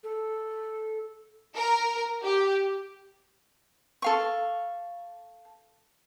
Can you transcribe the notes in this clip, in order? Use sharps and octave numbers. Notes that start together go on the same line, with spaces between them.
A4
A#4
G4
A4 F5 C#6